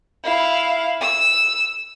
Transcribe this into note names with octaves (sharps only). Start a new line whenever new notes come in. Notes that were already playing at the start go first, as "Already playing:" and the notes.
E4 F5
E6